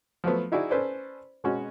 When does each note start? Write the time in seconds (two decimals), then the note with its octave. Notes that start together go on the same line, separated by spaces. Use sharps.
0.24 F3 F#3 A3 B3
0.52 D#4 E4 F#4 G#4 D5
0.70 C#4 A4 B4 C5 D5
1.44 B2 G#3 C#4 F#4